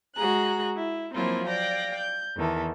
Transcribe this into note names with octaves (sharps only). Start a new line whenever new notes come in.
G#3 F#4 G#4 A#5 F#6
E4
F3 F#3 A#3 C4 E4 F4
D5 F5 G5 A#6
G6
E2 D#3 E3 A4